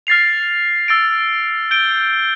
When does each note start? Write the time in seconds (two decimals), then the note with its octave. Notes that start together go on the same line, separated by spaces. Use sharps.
0.07 F6 A6 C7 F7
0.88 E6 A6 D7
1.71 G6 D7 G7